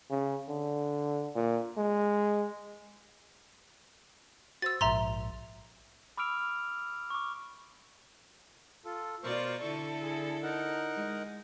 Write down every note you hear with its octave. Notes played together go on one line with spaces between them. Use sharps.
C#3
D3
A#2
G#3
F#4 C5 E6 A6
A#1 G#2 E5 A#5 C6
B5 D6 E6 F6 D7 F7
C#6 D6
F4 A4
B2 F4 A#4 C5 D5 C#6
D3 E4 A4 C#6
G#4
D#4 A#4 F#5
G#3